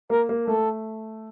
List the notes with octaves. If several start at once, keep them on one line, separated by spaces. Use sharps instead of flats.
A#3 A#4
A#3
A3 A4